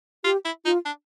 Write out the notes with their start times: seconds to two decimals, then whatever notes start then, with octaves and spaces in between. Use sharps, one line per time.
0.24 F4 G4
0.45 E4
0.65 D#4 F4
0.85 D4